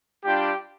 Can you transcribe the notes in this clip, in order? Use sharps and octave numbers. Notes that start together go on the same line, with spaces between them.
G3 D4 F4 G4